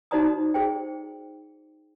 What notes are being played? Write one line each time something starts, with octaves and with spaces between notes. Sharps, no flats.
D#4 F#4 C5 D5 A#5 D#6
G#4 C5 G5